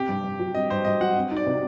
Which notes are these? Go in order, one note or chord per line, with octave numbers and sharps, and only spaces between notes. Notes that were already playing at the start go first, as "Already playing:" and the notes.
Already playing: C3 C4 G4
G2
G2
F#3
C4 D#5
G2 C5
G2 D#5
F#3 F#5
C4
D#4
D5
C3